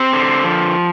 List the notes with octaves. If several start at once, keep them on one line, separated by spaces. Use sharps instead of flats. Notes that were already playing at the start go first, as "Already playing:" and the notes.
Already playing: C4 G4
D3
F3